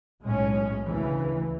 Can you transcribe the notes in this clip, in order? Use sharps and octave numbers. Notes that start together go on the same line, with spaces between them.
B1 A2 G#3 C#4
D2 C#3 E3